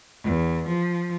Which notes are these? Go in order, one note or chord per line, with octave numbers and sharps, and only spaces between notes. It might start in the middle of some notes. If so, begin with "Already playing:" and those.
E2
F3